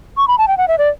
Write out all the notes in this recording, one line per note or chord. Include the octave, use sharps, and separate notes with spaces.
C#6
B5
A5
G5
F#5
E5
D5